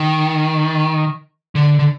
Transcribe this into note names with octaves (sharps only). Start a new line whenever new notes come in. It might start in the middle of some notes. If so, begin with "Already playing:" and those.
Already playing: D#3
D3
D3